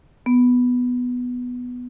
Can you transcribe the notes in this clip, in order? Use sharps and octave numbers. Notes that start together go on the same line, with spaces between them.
B3